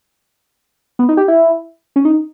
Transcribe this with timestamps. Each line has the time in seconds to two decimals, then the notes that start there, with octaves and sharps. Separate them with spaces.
0.99 B3
1.09 D#4
1.17 G4
1.28 E4
1.96 C#4
2.05 D#4